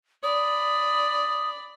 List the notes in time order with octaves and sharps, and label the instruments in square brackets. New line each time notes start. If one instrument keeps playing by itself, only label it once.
[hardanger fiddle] D5 B5 [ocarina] D#6